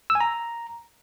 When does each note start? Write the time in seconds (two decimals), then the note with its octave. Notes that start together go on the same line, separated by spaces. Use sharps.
0.10 E6
0.15 G#5
0.21 A#5